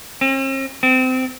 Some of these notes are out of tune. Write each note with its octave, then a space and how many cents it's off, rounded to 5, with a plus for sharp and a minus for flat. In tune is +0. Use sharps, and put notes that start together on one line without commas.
C4 +45
C4 -25